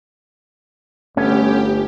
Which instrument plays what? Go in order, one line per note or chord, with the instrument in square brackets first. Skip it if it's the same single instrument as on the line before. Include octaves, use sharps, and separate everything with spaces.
[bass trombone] G1 [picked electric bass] A3 [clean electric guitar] B3 C#4 [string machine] G4